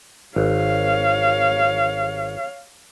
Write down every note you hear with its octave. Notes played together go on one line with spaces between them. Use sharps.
G#1 C#5 F5